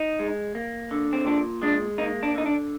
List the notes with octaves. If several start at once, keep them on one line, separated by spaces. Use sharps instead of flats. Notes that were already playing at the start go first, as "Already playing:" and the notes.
Already playing: D#4
G#3
A#3
D3
C4
A#2 D4
G#3 D4
A#3 D#4
D4
D3 D#4
D4